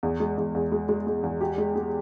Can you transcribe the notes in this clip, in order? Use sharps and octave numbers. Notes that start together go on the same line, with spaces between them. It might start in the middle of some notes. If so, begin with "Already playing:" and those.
E2
G#3
E2
E2
G#3
G#3
G#3
E2
G4
G#3
G#3